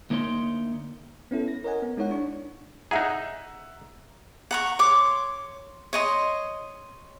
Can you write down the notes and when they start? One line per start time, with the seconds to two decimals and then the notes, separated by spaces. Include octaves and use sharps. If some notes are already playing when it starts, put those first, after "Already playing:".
0.10 D2 A#3 D#4 C#5 C6
1.31 B3 C#4 E4 A4
1.48 A#6
1.64 A#4 C#5 D#5 F#5 G#5
1.82 B3
1.97 G#3 D#4 E4 C#5 F#5
2.11 D4 C#6
2.91 D#4 G#4 E5 F#5 A#5
4.51 F#5 A#5 C#6
4.79 C#5 C6 D6
5.93 C#5 D#5 C6